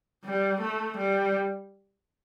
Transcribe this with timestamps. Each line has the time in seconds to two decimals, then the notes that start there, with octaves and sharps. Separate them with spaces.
0.24 G3
0.61 A3
0.97 G3